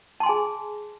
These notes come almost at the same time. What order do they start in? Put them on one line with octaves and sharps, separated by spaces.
A5 C6 G#5 G#4